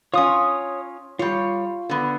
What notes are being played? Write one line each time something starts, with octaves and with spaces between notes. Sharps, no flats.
C#4 F4 C#5 D#6
G3 F4 C#5
D3 B3